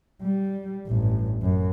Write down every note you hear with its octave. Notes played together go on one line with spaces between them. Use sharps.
G3
A1 G2
F#2